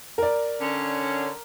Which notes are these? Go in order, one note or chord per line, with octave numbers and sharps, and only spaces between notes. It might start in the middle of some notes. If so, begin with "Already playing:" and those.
A#4 D5
D3 C#4